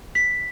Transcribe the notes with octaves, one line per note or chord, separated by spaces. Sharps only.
B6